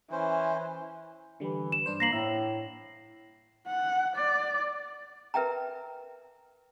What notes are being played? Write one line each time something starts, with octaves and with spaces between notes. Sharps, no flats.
E3 C#4 C5
D3 E3 G3
E7
G2 D4 C5
A#3 A#6 C7 F#7
A2 E5
F#5
D5
A#4 B4 E5 G5 A#5